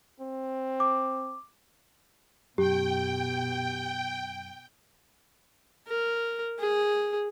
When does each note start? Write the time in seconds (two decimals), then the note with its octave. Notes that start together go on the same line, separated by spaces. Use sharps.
0.20 C4
0.80 D6
2.58 F#2 B2 G4 G5
5.88 A#4
6.60 G#4